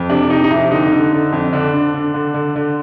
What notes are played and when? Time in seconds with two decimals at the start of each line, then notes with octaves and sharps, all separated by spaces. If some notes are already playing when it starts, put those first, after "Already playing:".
Already playing: F2
0.10 C3 D4
0.30 C3 D#4
0.44 D#4
0.51 F2 E4
0.71 D3 D#4
0.92 D3
1.12 D3
1.32 F2
1.53 D3 D4
1.73 D3
1.94 D3
2.14 D3
2.34 D3
2.56 D3